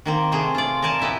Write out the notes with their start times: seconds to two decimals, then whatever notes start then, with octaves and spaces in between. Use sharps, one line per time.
0.05 D#3 A#3 C4
0.32 C3 A3 C4 G#4
0.54 F4 D5
0.82 A#4 C5 D5 G#5 A5
0.99 A#2 B3 E4 G4 D#5